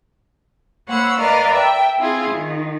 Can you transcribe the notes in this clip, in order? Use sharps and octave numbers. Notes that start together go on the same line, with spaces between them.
A#3 C5 C#5 F#5 B5 E6
A#4 B4 D5 D#5 F5 A#5
E5 G5
C4 E4 F4 G#4
D#3